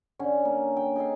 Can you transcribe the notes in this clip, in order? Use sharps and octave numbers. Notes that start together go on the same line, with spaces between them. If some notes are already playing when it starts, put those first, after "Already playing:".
D3 C#4
A#3
G5
D#4 G#4 A4 F5